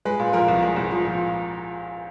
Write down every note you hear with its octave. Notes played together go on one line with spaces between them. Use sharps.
G#3 B4
A#2
F3 A#4
C2
G#3
C2
F3
A#2